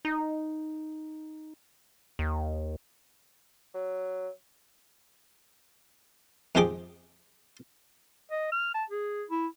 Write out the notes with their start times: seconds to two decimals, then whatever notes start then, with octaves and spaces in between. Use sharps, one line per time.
0.05 D#4
2.19 D#2
3.74 F#3
6.55 F2 G#2 F3 G4 G#4 D6
8.31 D#5
8.52 F6
8.74 A5
8.90 G#4
9.29 E4